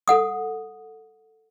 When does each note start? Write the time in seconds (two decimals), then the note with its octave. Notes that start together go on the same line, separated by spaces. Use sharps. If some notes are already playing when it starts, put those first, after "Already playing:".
0.08 A4 F#5 D#6